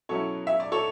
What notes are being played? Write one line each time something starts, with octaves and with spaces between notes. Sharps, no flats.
B2 F#3 C#4 E4 A4 C#5
E5
D5
A4 C#5